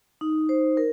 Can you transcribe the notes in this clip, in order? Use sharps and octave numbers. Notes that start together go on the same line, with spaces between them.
D#4
C5
A#4